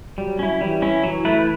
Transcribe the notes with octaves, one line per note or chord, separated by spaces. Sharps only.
F#3 G3
C#4 E4
E3 G3
C#4 E4
E3 F#3
A3 E4 B4